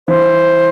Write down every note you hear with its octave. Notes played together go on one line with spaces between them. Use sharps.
E3 C5